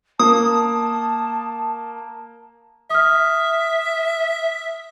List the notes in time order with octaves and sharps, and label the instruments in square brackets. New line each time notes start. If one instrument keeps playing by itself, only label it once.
[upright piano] A#3 [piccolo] A5 [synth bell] D#6
[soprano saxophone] E5 [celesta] D#6 F6